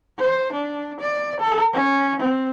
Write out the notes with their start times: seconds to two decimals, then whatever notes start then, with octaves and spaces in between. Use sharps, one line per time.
0.19 C5
0.52 D4
1.00 D5
1.40 A4
1.73 C#4
2.20 C4